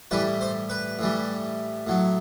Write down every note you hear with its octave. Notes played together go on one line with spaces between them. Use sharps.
A2 E3 G3 B4
C5
B4
A2 E3 G3
A2 F#3